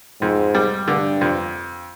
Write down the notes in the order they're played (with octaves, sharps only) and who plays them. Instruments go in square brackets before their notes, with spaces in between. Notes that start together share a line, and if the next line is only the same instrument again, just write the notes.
[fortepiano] F2 [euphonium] G#2
[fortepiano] G3
[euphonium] G2 [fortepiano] D3
[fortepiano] F2